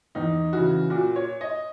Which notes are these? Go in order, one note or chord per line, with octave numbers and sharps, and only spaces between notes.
E2 D#4
C#3 E3 F#4
A#2 F#4
C#5
D#5